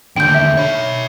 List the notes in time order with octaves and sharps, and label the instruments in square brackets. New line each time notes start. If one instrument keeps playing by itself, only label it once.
[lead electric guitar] D#2 D3 [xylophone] G5 G6
[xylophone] E5
[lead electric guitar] C#5 B5